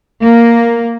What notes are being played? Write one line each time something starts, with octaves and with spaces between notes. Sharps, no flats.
A#3